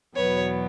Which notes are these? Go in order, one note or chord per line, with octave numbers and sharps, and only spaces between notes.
E2 B2 F#3 B3 B4 C#5